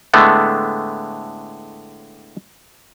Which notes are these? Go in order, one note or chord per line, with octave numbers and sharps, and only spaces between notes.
A2 D3 G#3 A3 B3